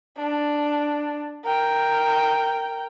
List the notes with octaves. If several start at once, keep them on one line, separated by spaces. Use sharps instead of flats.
D4
A#4 G5